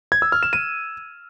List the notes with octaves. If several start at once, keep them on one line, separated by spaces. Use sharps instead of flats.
G#6
E6
F6
E7
D#7